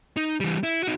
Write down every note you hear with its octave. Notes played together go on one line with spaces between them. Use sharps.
D#4
E3 G3
E4
D#4 F#4